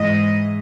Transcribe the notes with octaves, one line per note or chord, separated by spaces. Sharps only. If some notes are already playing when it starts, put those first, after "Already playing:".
Already playing: G#2 E3 D#5